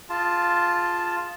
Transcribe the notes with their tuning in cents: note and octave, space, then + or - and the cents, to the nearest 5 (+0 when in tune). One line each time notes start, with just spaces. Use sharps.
F4 +0 G#4 +0 A5 +0